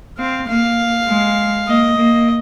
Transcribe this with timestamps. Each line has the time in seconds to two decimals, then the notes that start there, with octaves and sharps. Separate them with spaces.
0.18 C4 F5
0.48 A#3 F5
1.09 G#3
1.67 A#3 D#5
1.98 A#3